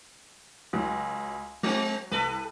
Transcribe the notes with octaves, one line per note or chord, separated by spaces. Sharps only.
C#2 F#3
F#3 G#3 C4
C2 A4 B4